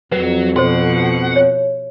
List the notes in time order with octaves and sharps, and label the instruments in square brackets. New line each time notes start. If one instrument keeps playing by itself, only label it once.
[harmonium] F2 [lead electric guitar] F#3 [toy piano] B4
[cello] B2 F3 [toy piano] F#4 A4 C5 [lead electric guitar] F#5
[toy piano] C#5